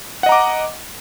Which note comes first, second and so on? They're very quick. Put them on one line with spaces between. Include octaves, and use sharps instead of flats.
F#5 D#5 A#5 D6